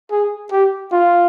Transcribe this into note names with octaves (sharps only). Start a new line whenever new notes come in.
G#4
G4
F4